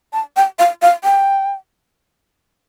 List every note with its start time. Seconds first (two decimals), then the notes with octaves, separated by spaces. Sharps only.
0.13 A5
0.37 G5
0.59 F5
0.82 F5
1.04 G5